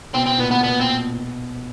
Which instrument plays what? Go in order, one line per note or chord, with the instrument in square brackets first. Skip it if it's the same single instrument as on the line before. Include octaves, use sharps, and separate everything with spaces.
[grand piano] B2 [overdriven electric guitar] C4
[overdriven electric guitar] C4
[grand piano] A#2 [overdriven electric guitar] B3
[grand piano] B2 [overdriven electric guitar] B3
[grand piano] A#2 [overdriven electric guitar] B3
[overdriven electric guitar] C4
[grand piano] B2